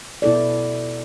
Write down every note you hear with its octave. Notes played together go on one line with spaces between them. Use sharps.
B2 B3 E4 A4 D5